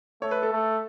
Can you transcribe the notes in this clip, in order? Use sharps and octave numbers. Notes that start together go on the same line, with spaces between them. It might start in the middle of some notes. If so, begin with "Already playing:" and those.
A3 C#5
B4
A4
A3